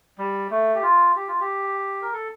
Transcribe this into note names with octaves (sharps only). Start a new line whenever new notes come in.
G3
A3
G4
F4
G4
F4
G4
A#4
A4